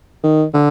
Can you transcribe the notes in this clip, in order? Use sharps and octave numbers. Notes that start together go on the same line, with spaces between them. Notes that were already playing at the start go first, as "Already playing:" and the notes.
D#3
D3